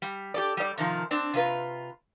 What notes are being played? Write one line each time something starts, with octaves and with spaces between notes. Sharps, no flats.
G3
G4 A4 D5
G3 D5
C3 D#3 F3
C4 D4
C3 F4 B4